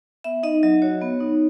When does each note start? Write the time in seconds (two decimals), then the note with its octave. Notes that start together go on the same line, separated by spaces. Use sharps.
0.24 B3 E5
0.43 D#4 D#5
0.63 F#3 D#5
0.82 F#4 C#5
1.01 B3
1.20 D#4